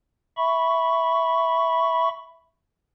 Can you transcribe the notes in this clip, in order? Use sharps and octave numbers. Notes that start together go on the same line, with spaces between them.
E5 B5 C#6